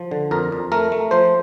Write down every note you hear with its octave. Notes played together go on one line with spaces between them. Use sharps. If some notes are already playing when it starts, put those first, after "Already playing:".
Already playing: F3
D3
F2 A#4
F2
A3 A#4
A3
F3 C5